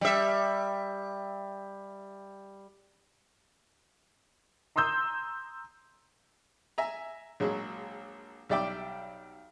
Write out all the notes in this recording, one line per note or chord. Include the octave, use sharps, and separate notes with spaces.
G3 E5
A#5 C6 D#6 E6 G6
E5 G#5 A#5
A#1 F#3 G#3
B1 G3 D5 E5 G5 D6